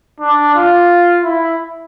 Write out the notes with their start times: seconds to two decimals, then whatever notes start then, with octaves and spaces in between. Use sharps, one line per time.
0.20 D4
0.55 F4
1.24 E4